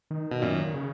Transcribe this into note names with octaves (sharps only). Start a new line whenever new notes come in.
D#3
B2
F#2 A#2
D#3
C#3